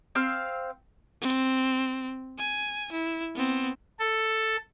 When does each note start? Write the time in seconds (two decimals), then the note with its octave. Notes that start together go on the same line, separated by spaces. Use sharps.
0.15 C4 F5 E6 F6
1.22 C4
2.38 G#5
2.92 E4
3.35 B3 C4
3.99 A4